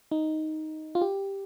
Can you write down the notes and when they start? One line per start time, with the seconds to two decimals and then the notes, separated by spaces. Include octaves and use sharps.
0.11 D#4
0.95 F4
1.01 G4